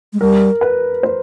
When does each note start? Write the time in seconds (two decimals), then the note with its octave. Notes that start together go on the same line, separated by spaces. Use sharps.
0.13 G#3
0.20 G3 A#4
0.61 B4
1.03 C5